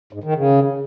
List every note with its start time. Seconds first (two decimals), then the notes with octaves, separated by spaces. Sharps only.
0.13 G#2
0.24 D#3
0.35 C#3